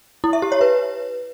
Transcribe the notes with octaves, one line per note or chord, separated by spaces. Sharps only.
E4
E5
G4
C#5
B4